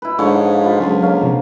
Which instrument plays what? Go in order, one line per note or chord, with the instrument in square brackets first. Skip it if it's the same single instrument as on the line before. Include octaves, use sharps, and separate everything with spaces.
[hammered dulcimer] E4 B4
[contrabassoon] G#2 [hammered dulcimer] D3 F3 C#5
[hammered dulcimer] F4 B4 C5
[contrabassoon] C#2 [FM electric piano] F#3
[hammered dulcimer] A#3 [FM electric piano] C#5 F5
[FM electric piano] C3 F3